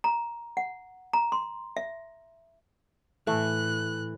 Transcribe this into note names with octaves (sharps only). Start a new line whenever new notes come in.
A#5
F#5
A#5
C6
E5
A2 E3 A3 F#6